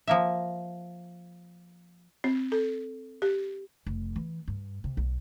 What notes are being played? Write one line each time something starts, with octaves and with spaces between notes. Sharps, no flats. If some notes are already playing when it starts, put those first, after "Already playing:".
F3 A#3 E5
C4
A4
G4
F1
E3
G2
C3
B1